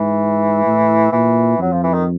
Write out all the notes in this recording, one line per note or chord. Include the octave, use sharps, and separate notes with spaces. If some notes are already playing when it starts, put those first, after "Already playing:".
Already playing: G#2 E3
A2
A#2 E3
F2 F#3
F3
E3
D#3